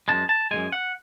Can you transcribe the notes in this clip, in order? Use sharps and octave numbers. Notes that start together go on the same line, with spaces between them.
F#2 C#3 G#3 A5
A5
F#2 C#3 G#3 G#5
F#5